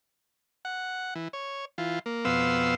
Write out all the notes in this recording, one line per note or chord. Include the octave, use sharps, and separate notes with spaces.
F#5
E3
C#5
E3 F4
A#3
F2 B2 B3 F5 C6 E6